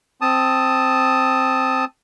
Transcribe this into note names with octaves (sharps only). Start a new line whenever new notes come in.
C4 A5 D#6